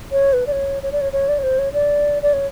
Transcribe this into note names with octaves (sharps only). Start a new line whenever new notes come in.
C#5
B4
D5
C#5
C#5
D5
C#5
C#5
D5
C#5
C5
C#5
D5
D5
C#5